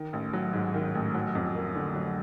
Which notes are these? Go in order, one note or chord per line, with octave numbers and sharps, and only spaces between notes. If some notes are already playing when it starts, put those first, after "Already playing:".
Already playing: D#3
A1
F#3
G#2
D#3
A1
F#3
F2
A#3
D3
F#3